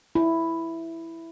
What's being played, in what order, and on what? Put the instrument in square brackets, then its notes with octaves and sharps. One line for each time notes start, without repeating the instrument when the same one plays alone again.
[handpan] E4